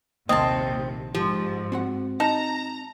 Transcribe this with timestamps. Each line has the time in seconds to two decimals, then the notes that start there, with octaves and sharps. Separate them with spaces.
0.29 A#1 D#2 C3 D#3 A#3 C4 D#5 A5
1.15 G#2 F3 G4
1.72 C4 F#4 F#5
2.20 D#4 A5 A#5